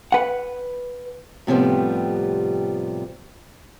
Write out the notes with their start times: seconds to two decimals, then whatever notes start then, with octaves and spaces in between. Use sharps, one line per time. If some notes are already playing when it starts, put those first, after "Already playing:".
0.12 B4 F#5
1.47 A2 C3 F3 G3 B3